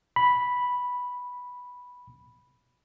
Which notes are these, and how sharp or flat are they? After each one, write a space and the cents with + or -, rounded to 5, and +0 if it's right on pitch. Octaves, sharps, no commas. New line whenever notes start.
B5 -5